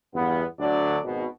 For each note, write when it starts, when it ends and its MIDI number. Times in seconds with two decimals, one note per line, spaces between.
0.15 0.45 40
0.15 0.45 43
0.15 0.45 59
0.59 0.98 38
0.59 0.98 50
0.59 0.98 54
0.59 0.98 62
0.59 0.98 74
1.04 1.26 32
1.04 1.26 47